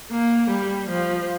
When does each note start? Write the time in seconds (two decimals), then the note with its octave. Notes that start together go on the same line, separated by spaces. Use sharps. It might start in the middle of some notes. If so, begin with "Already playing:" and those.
0.11 A#3
0.50 G3
0.89 F3